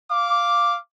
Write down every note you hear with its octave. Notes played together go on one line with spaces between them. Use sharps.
F5 D6